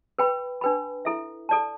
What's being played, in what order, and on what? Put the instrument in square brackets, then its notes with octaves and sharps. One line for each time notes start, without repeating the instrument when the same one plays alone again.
[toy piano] B4 G5 B5
D4 B4 G5 B5
E4 A4 E5
A4 D5 A5